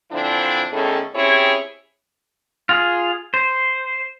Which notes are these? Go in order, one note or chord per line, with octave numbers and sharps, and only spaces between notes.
D3 E3 F3 C4 D4 E4
E2 A2 D#3 C#4 G#4 A4
C4 C#4 E4 G4 G#4 C#5
F4 G#4
C5